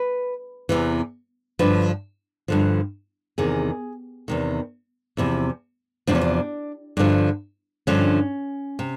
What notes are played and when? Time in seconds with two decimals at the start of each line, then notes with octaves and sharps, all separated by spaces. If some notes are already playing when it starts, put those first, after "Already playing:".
Already playing: B4
0.69 E2 C3 E3
1.59 G2 D3 F3 B4
2.48 G2 D3 F3
3.38 E2 C3 D#3 G#4
4.28 E2 C3 D#3
5.17 E2 C3 F3 E4
6.07 E2 C3 F3 D4
6.15 C#4
6.21 D4
6.97 G2 D3 F3
7.87 G2 D3 F3 C#4
8.79 C3